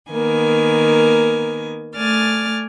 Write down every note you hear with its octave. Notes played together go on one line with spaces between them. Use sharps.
D#3 A#3 B3 G#5
A3 D5 G#5 F6 A6